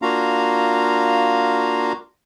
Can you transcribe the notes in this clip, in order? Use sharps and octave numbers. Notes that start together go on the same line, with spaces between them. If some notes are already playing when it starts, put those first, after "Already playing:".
A#3 D4 F4 F#4 F5 A#5